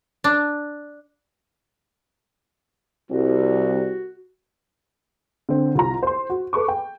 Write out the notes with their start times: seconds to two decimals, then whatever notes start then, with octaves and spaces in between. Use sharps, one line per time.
0.24 D4
3.11 C2 F#4
5.49 D3 C4
5.75 C2 F4 A#5
6.03 C5 C6
6.30 F#4
6.53 A4 B4 C#6 D6
6.68 G5